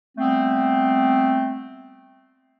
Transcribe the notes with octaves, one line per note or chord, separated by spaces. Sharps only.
G3 A3 B3 C4